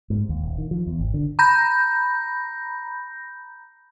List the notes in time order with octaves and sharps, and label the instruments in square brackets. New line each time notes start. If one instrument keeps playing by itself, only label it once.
[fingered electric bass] G#2
D#2
D#1
D#3
F3
E2
G#1
D3
[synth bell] A#5 B5 G6 A#6